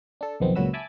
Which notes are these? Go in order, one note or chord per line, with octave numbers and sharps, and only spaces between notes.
D4 A4
B1 F2 D#3 B3 C4
C#2 A#2 F#3 F#4 B4 E6
E5 G#5 A5 B5 D6 E6